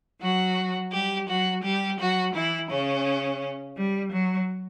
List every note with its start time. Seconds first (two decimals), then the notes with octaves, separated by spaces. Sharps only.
0.21 F#3 F#4
0.92 G3 G4
1.27 F#3 F#4
1.62 G3 G4
1.99 F#3 F#4
2.34 E3 E4
2.70 C#3 C#4
3.76 G3
4.12 F#3